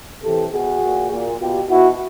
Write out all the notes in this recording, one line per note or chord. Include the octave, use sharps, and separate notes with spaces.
C3 E3 G4 A4
B2 F#4 G#4
A#2
A#2
B2 F4 G4
B2 E4 F#4